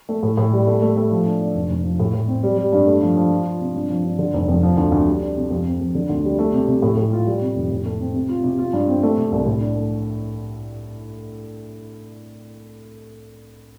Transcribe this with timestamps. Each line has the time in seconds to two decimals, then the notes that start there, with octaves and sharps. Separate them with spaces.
0.09 A3
0.23 A2
0.37 A2
0.53 G3
0.67 A3
0.82 A3
0.97 A3
1.11 F3
1.25 D4
1.41 D4
1.55 F1
1.70 F1
1.84 F3
2.00 A2
2.13 A2
2.28 C4
2.43 G3
2.58 G3
2.73 G2
2.87 A3
3.02 F3
3.16 F3
3.31 F4
3.45 F4
3.61 C3
3.75 G2
3.90 F3
4.04 G2
4.19 D3
4.34 F1
4.48 F2
4.63 F3
4.77 D2
4.92 D2
5.07 G3
5.21 D4
5.36 C3
5.50 F2
5.66 C4
5.81 F2
5.95 D3
6.09 D2
6.24 G3
6.39 A3
6.53 C3
6.67 C3
6.82 A2
6.97 A2
7.13 F4
7.27 G3
7.42 C3
7.56 F1
7.71 A2
7.86 A3
8.00 C4
8.14 C3
8.29 F4
8.44 C3
8.58 F4
8.73 G2
8.88 C4
9.03 A3
9.17 C3
9.32 C2
9.46 A2
9.61 D4
9.75 A3